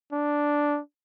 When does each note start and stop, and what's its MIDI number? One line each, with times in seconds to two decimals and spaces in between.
0.12 0.79 62